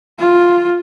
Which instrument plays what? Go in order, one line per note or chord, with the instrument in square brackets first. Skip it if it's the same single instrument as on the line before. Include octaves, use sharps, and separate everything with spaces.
[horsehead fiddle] F4